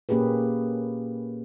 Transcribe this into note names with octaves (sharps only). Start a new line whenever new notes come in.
A#2 A#3 C#4 G4 G#4 B4